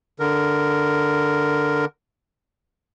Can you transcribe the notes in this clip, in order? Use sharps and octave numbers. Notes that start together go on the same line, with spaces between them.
D3 A#4